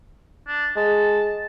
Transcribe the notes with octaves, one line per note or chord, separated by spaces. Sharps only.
D4
G#3 A5